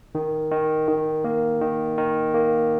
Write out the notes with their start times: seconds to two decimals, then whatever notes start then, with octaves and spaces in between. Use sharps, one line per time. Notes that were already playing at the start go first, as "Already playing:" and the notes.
0.15 D#3
0.51 D#3
0.88 D#3
1.24 A#3
1.61 D#3
1.98 D#3
2.34 A#3